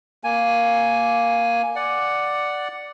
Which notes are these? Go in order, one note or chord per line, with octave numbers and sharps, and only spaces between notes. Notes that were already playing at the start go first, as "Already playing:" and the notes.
A#3 G#5
D5 F#5